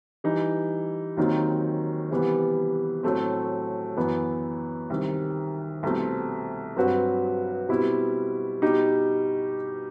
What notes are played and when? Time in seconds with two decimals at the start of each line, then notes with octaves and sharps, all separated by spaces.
0.24 E3 G3 D#4
1.17 D#2 D#3 F#3 C4 D#4
2.10 C3 E3 G3 B3
3.03 A2 F#3 A3 C4
3.97 F#2 E3 B3
4.90 C2 C3 D#3
5.83 C2 B2 A3 C4
6.76 G2 F#3 C4 F#4 B4
7.69 B2 G3 C4 E4
8.62 B2 G3 D#4 G4